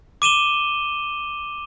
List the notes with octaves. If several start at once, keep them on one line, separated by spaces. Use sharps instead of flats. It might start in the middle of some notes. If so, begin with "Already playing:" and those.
D6 D#7 E7 G7